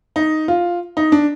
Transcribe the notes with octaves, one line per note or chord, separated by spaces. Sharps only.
D#4
F4
D#4
D4